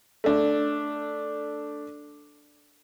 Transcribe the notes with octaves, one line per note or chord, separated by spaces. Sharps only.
A3 D4